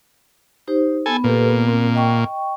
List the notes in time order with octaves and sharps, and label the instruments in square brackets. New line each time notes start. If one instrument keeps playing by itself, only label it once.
[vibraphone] D#4 G4 C5
[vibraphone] B3 B5 [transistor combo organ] A4 G#5
[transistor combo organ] A#2 [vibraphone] G4 A4 B4
[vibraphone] B3
C4 A#4
D#5 G5 C#6